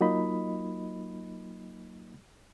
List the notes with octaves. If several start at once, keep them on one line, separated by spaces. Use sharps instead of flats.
F#3 A#3 D#4 F4 D#5 B5